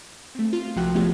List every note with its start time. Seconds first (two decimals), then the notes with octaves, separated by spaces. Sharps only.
0.35 A3 C4
0.53 F4
0.76 C2 C3 F3 F#4 G5 F#6
0.94 F3 G#3 A3 B3 F4 G4